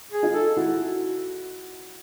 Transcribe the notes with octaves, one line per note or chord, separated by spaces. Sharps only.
G#4
D#4 F4
A4
E4 F#4